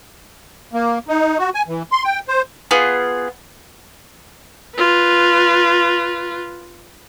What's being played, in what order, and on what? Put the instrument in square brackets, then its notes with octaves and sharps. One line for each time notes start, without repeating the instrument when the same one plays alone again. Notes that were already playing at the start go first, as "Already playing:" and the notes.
[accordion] A#3
D#4
F#4
G#5
E3
C6
G5
C5
[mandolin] B3 F4 G#4
[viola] F4 B4